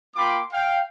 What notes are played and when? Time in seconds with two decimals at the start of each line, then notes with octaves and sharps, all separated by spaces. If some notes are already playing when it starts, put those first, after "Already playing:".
0.16 A#3 F4 G5 B5 C6 D6
0.53 F5 G5